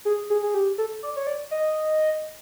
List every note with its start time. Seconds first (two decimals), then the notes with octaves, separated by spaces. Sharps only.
0.05 G#4
0.30 G#4
0.43 G#4
0.54 G4
0.78 A4
1.03 D5
1.16 C#5
1.27 D5
1.51 D#5